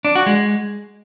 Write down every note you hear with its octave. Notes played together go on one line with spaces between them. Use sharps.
D4
F#4
G#3